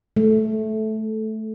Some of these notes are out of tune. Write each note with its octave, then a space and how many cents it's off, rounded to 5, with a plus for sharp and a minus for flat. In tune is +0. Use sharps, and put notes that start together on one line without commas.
A3 -10